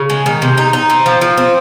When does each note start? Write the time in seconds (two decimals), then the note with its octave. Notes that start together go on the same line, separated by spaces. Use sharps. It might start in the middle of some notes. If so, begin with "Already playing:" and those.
Already playing: C#3
0.10 G#3
0.26 D#3
0.42 C3
0.58 D#4
0.73 D#4
0.90 C4
1.06 F3
1.21 F3
1.38 C4